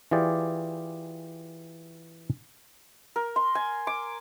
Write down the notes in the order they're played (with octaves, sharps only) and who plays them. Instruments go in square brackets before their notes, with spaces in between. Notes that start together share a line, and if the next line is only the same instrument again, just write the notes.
[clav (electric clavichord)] E3 F4 G4 G#4 D5
[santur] A#4
C6
G#5
D6